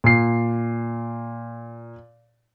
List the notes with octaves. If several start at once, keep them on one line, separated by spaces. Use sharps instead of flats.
A#2 C7